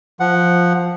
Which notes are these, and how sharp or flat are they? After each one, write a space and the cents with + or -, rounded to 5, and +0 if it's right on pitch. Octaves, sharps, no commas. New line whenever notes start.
F3 +5 F#5 +0